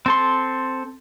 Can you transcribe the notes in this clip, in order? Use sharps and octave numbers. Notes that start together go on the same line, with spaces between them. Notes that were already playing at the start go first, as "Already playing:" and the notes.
C4 A4 C6